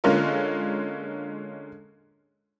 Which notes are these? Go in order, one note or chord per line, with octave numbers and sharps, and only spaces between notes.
D3 G#3 A#3 C#4 F4 A#4